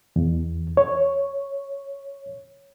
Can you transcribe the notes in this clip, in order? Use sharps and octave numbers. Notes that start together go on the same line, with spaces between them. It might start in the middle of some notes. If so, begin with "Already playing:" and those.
E2
C#5